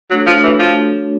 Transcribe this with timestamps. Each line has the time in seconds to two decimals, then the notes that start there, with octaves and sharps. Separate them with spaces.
0.11 F#3 A3 D4 F#4 A4 C#5
0.27 F3
0.43 E3
0.59 F3